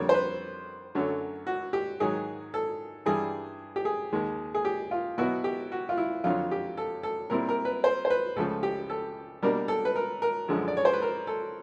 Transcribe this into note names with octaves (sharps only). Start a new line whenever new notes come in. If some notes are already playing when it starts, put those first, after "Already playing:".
Already playing: F2 D3 G3 A#3 C#5
C5
B4
F#2 D3 F#3 A3
F#4
G4
G#2 D#3 F#3 G#4
A4
G2 E3 G3 G#4
G4
G#4
D#2 D#3 G#3
G#4
G4
F4
B2 F#3 B3 E4 F#4
G4
F#4
F4
E4
F2 D3 F#3 F4
G4
A4
A4
A#2 G3 C4 E4 A#4
A#4
B4
C5
C5
B4
C#2 C#3 F3 A3 A4
G4
A4
B2 G3 A#3 D4 A#4
A4
B4
A#4
A#4
F#2 D3 F3 G#3
D5
C#5
C5
B4
A#4
A4